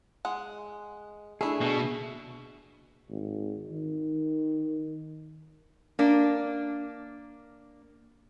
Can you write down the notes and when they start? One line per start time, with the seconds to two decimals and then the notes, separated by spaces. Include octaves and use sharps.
0.25 G#3 F#5
1.41 A3 D4 E4 G#4
1.61 B2
3.10 G#1
3.71 D#3
5.99 A#3 D4